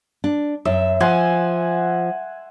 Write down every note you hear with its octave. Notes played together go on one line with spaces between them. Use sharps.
D4
F#2 E5
F3 F#5 G#5 C6